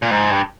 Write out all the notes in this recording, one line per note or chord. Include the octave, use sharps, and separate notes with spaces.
A#2
G#2
G2